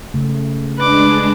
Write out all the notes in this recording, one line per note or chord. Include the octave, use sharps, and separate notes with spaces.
C#3 A3
G#3 D4 B4 D6